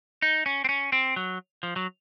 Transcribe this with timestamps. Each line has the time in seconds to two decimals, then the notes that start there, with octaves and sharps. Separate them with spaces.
0.22 D#4
0.46 C#4
0.65 C4
0.69 C#4
0.92 C4
1.16 F#3
1.63 F3
1.76 F#3